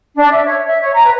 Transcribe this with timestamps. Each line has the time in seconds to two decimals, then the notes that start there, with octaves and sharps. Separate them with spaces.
0.16 D4
0.31 E5
0.44 C#5
0.66 E5
0.81 C#5
0.93 A#5
1.06 B4